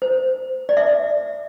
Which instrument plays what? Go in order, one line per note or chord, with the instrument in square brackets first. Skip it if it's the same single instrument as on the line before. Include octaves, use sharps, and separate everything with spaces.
[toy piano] C5
D5
E5